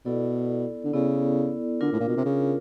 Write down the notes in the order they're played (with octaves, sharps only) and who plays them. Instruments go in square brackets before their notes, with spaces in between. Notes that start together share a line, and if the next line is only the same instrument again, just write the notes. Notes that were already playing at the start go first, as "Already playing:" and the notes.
[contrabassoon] B2 [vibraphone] B3 E4 A4 D5
[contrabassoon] D3
[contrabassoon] C#3 [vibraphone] B3 E4 A4 D5
[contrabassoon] D3 [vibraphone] D4 F4 A#4
[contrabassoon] A2
A#2
B2
C3
C#3